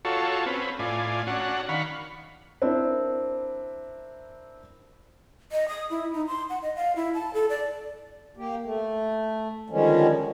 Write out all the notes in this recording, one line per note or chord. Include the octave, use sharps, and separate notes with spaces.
F4 F#4 A4 C#5
C4 C#4 B4
A2 F4 D5 G#5
C#4 D4 F#4 F#5
D#3 F5 F#5 B5 C#6
C4 D4 E4 A#4 C5
D#5
D#6
E4
D#4
C6
F#5
D#5
F5
E4
A5
A4
D5
A#3 G4
A3
D3 D#3 F3 G3 G#3 C#4